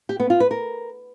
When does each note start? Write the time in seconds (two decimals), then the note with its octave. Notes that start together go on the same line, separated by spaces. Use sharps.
0.09 G4
0.20 B3
0.30 F4
0.40 B4
0.51 A#4